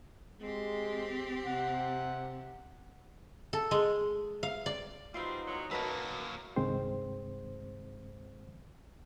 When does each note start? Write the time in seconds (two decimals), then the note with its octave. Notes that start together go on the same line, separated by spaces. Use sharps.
0.40 G#3 C4 G4
1.46 C3 F#5
3.53 A4
3.71 G#3
4.43 F5
4.66 D5
5.14 G3 C4 D#4 F4 F#4 B4 C5
5.46 E2 D3 F#3
5.71 F#2 F#3 A#3 B4 A5 A#5
6.56 C2 G2 D#3 G#3 C4 C5